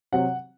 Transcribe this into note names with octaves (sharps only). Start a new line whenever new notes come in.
C3 F#3 C4 F#5